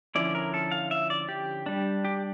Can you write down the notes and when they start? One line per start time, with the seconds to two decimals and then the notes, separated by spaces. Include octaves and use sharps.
0.15 D3 F3 C#4 E4 D5
0.35 A#4
0.54 A4
0.71 F5
0.91 E5
1.10 D5
1.29 G4
1.66 G3 D4
2.05 G4